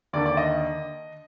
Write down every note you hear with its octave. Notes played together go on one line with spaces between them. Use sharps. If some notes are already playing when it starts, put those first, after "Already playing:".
D#2 D3 D5
D5
D#5